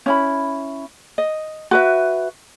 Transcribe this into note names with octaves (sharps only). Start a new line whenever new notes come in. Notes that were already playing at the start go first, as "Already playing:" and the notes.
C#4 E4 B5
D#5
F#4 B4 E5